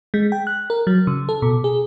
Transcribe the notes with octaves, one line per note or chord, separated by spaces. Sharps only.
G#3
G5
F#6
A#4
F#3
C#3
A4
B2
G#4